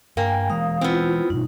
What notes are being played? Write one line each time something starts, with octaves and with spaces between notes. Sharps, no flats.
G2 A#3 G5 G#5
E3 G#3 F5 D#6
B3 C4 E4 F4
G2 B2 D#4